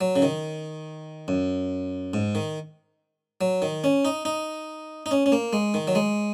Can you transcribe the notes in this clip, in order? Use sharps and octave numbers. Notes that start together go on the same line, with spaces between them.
F#3
C#3
D#3
F#2
G#2
D#3
F#3
D#3
C#4
D#4
D#4
D#4
C#4
C#4
A#3
G#3
D#3
F#3
G#3